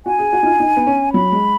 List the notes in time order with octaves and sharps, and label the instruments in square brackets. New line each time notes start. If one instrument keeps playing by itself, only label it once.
[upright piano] F#4 [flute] G#5
[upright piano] G#4
F#4
D#4
F4
D#4
B3
C#4
[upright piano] F#3 [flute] B5
[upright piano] G#3